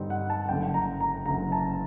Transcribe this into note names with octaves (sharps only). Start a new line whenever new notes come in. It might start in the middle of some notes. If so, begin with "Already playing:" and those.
Already playing: G2 D3 G3 C4 D#4 D#5
F#5
A5
F#1 F#2 D3 G5
A#5
A#5
F#1 F#2 D3 A#5
A5